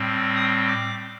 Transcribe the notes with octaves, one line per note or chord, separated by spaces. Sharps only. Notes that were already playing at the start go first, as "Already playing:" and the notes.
Already playing: A2 G3 C4
D#6
D6